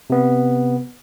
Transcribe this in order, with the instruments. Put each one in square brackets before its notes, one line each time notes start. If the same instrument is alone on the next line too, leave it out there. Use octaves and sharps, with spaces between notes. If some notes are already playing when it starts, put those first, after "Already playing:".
[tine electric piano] C3 B3